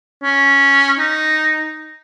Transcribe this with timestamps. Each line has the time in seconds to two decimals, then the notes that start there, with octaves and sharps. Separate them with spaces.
0.23 C#4
0.99 D#4